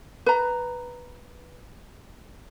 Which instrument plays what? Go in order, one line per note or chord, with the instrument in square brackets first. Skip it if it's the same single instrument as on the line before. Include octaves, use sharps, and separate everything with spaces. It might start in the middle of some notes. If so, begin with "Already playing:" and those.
[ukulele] B4 A#5